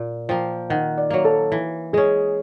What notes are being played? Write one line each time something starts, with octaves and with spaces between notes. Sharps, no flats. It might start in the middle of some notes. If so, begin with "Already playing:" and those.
Already playing: A#2
F3 A#3 G5
D#3 F#5
D5
F#3 A#3
A4
E3
G#3 C#4 G#4